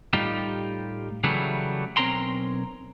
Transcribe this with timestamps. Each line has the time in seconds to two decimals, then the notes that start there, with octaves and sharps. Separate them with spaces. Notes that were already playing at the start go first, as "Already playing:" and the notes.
0.13 A2 G3 D#4 F4 G4
1.24 C#3 E3 F#3 G3 A3
1.97 B1 C4 C#4 A#4 A#5 C6